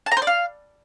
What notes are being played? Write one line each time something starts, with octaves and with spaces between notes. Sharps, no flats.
A5
A#5
C5
D5
F5